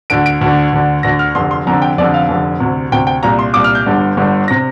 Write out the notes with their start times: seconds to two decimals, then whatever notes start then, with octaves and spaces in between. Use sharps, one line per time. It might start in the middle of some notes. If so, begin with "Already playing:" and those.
0.10 D2 D3 D7
0.26 D7
0.41 D2 D3
0.73 D2 D3
1.03 D2 D3 A#6
1.19 F6
1.35 F1 F2 D3 C6
1.51 C6
1.66 F1 F2 D3 A#5
1.82 G5
1.98 F1 F2 D3 D5
2.14 F5
2.29 F1 F2 D3
2.60 D2 C3
2.92 D2 C3 G5
3.07 G5
3.23 C2 A#2 A#5
3.39 C6
3.54 C2 A#2 D6
3.64 F6
3.75 G6
3.86 G1 G2 D3
4.17 G1 G2 D3
4.48 A#6
4.51 C3